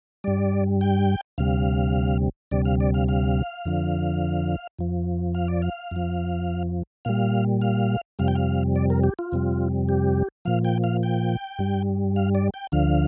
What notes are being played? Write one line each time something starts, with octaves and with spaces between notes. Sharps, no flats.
G2 G3 D5
G5
D2 C3 G3 F5
D2 C3 G3 D5
F5
D5
F5
F5
F2 D3 F3
F2 F3
F5
D5
F5
F2 F3
A#2 G3 F5
F5
F2 C3 G3 F5
G5
F5
D5
A#4
G4
F4
F2 C3 G3
G4
A#2 F3 F5
G5
F5
G5
G2 G3
F5
D5
G5
D2 D3 F3 F5